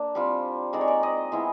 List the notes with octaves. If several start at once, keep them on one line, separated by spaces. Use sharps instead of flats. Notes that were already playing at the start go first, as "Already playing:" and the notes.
Already playing: A#3 D4
G3 C4 F4
G#3 C4 D#4 D5
C#5
D5
D#5
G#3 B3 E4